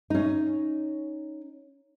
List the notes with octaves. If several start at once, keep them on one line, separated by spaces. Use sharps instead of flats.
C#4 D#4